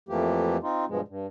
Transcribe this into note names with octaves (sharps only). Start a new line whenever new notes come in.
F2 E3 F3 A3 A#3 G4
C4 D#4 F4
G2 B2 F3 G#3
G2